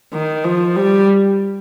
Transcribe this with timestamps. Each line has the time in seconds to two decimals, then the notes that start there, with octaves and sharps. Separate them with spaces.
0.13 D#3
0.44 F3
0.76 G3